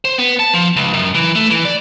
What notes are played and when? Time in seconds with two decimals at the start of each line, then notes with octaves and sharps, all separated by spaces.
0.05 C5
0.18 B3
0.39 A5
0.54 F3
0.76 C#2
0.93 F#2
1.15 E3
1.35 A3
1.50 E3
1.65 D5